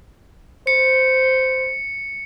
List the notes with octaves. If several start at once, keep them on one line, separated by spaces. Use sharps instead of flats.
C5 C#7